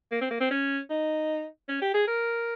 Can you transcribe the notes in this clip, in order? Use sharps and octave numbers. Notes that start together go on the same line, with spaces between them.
A#3
C4
A#3
C4
C#4
D#4
C#4
G4
G#4
A#4